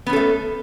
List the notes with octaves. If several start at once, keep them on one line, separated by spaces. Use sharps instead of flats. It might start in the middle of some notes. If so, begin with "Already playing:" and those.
A3 B3 C#4 A4